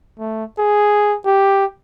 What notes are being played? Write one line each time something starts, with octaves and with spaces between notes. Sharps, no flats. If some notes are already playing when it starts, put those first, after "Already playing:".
A3
G#4
G4